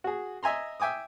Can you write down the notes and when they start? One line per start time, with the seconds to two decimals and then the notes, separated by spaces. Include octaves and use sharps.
0.04 F#4 G#4
0.43 D#5 E5 G#5 A#5 C6
0.80 E5 G5 G#5 D6 D#6